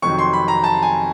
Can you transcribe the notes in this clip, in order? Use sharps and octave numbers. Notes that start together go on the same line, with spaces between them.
F2 C3 D#3 F#3 C#6
C6
B5
A#5
A5
G#5